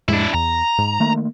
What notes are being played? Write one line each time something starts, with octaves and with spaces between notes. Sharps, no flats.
F2 A2 G#3 D4 E4
E2 A#5
G#2
D#3 A3 A#3